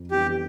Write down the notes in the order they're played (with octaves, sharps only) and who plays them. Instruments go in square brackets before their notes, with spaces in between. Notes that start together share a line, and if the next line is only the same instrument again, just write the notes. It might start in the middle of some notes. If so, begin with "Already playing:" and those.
Already playing: [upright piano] F2
[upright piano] E3 B3 D4 [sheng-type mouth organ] G4